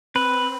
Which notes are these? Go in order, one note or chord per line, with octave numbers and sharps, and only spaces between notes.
C4 B4